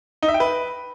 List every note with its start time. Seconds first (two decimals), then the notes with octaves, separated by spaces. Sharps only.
0.23 D#4
0.28 E5
0.34 G5
0.40 B4